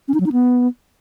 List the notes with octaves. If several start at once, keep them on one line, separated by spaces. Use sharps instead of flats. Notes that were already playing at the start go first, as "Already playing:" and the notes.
C#4
D#4
F#3
D#4
B3